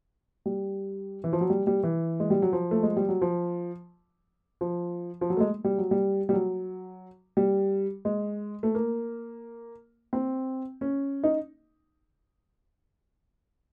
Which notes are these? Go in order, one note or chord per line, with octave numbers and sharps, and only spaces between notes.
G3
E3
F3
F#3
G3
G3
E3
G#3
G3
F#3
F3
A3
G#3
G3
F#3
F3
F3
F3
F#3
A3
G#3
G3
F#3
G3
G3
F#3
G3
G#3
A3
A#3
C4
C#4
D#4